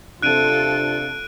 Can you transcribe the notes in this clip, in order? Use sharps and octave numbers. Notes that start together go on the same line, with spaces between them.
C3 D4 F4 A4 F#6 D7 D#7